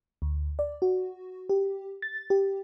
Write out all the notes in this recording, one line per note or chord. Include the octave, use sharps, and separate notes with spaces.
D2
D5
F#4
G4
A6
G4